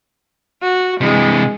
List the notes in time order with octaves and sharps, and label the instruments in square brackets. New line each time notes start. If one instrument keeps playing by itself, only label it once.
[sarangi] F#4
[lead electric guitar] C3 E3 [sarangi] G#3